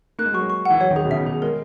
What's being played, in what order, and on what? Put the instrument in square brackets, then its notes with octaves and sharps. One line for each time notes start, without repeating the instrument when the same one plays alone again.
[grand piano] A#3 [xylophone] F#6
[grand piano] G#3
[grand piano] F#3 [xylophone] C#6
[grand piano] G#3
[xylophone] C#6
[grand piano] E3 [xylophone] F#5
[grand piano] F#3 [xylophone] C#5
[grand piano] D#3
[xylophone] G#4
[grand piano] B2
[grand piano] C#3 [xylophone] E5
[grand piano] B2
[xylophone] G#4
[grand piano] G#3 [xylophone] A#4